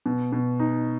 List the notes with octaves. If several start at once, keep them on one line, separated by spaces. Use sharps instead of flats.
B2
B2
D#4